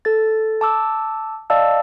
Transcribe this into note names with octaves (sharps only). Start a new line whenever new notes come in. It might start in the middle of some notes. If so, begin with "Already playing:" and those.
A4 A6
A5 D6 E6
D5 D#5 F5 A5 E6